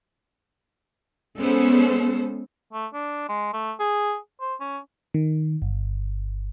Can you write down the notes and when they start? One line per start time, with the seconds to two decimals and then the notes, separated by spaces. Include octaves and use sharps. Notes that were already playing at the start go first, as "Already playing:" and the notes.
1.38 G#3 B3 C#4 A4 C5
2.73 A3
2.93 D4
3.29 G#3
3.53 A3
3.79 G#4
4.41 C5
4.60 C#4
5.14 D#3
5.62 G1